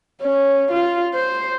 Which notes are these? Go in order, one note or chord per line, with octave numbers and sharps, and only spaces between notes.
C#4
F4
C5